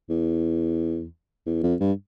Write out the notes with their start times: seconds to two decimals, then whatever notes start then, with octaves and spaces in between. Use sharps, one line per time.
0.10 E2
1.46 E2
1.63 F2
1.80 G2